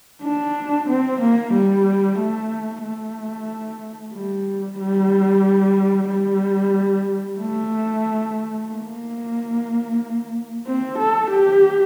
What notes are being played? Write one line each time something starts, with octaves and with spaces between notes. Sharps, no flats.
D4
C4
A#3
G3
A3
A3
G3
G3
G3
A3
A#3
C4
A4
G4